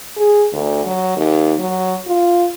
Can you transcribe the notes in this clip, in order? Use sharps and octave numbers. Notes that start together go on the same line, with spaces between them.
G#4
D2
F#3
D#2
F#3
F4